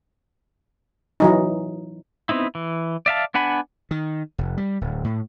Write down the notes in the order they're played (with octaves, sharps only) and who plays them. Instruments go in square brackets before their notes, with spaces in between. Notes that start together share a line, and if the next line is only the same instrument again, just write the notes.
[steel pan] E3 F#3 D#4
[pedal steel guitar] B3 C4 D#4 E4
E3
D5 E5 F5 A5
B3 D4 F#5 G#5 B5
[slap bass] D#3
F1
G3
D1
A2